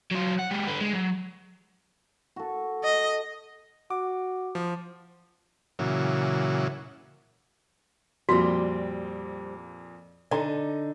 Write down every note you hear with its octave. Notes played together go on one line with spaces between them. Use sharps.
F#3 F4
F#5
G#3 G4
D3 B3
G#3
F#3
F#4 A4
D#5
F#4 D6
F3
A#2 C#3 E3 F#3
F2 A#2 G3 C4 F#4
D3 D#4 D5 A#5